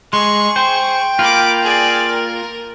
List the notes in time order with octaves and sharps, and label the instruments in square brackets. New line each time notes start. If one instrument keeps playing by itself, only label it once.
[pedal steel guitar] G#3 [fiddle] G#4 C#6 [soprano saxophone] C6
[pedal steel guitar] C5 [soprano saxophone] G5
[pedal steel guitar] A#3 F4 [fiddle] B5 D6
[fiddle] G#4 D5
A#4